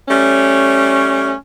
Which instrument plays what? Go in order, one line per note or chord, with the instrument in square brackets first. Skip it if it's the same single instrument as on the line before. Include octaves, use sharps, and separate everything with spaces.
[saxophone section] G3 A3 C#4